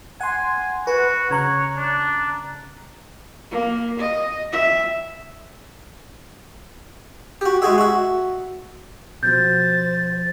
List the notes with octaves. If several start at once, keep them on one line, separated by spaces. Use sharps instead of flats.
F#5 G#5 C6
F#4 B4
C#3 C#5 A#5 F#6
D4
A#3
D#5
E5
F#4 G4
G#3 F#4 G#4 E5
F#4 E5
B2 F3 F#4 C5 G6 A6